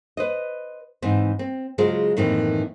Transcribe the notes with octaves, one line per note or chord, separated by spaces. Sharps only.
B4 C5 D#5
G#2 E3 C4 C5
C4
C#3 F#3 G#3 F4 G#4 C5
F#2 A2 D#3 E3 A#3 C4